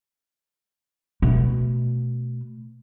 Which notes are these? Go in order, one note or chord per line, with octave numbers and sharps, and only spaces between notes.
B2 A3